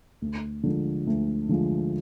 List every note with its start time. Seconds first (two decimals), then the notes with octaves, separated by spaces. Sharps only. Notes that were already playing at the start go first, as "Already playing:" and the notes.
0.22 D2
0.63 D3 F3 G#3
1.07 D2
1.49 D3 F3 G#3